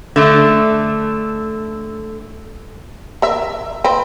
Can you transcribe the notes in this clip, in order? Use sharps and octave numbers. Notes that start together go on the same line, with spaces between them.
D3 A3
A#4 E5
C4 B4